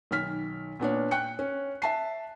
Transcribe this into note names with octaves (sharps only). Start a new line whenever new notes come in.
B1 D#3 F6 B6
A#2 B3 D4 C#5
G5 F#6 C#7
C#4
E5 A5 C7